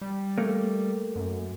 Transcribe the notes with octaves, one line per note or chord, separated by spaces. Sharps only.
G3
A3 A#3
F#2